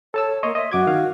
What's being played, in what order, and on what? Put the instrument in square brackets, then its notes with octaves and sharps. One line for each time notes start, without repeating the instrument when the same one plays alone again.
[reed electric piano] A4 A5 E6 [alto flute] C#5
[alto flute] A#3 [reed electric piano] C#5 D#5 C6
[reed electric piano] D#5 [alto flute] E5
[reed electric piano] F#2 D6 G#6 [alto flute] F#4
[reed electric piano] D#3 F5